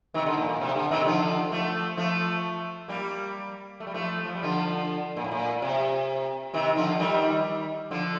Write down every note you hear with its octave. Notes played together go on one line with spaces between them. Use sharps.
C3 D#3
D3
A#2
A#2
C3
D3
C3 D#3
D3 F3
F3 A3
F3 A3
G3 A#3
A3
G3
F3 A3
F3
G3
D3 F3
A#2
A2
A#2
C3
C3 D#3
D3 F3
D#3 G3
D3 F3